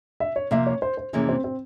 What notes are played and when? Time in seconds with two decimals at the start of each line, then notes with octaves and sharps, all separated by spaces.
0.20 E5
0.36 C#5
0.51 C3 F3 A#3 E5
0.67 C#5
0.82 C5
0.97 C5
1.13 F2 C3 E3 A#3 C#4 G#4
1.29 C4
1.44 C4